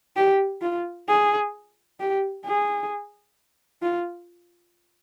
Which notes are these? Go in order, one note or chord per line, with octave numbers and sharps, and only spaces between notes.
G4
F4
G#4
G4
G#4
F4